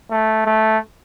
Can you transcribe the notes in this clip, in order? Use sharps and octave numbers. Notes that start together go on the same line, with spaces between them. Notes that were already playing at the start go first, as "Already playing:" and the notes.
A3
A3